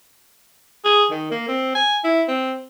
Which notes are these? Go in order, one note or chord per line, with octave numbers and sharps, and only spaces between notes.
G#4
D#3
A#3
C4
G#5
E4
C4